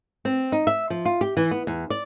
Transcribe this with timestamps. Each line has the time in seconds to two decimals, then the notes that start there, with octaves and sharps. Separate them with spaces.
0.25 C4
0.52 D#4
0.67 E5
0.90 F3
1.05 F4
1.21 G4
1.37 E3
1.51 B3
1.67 E2
1.90 D5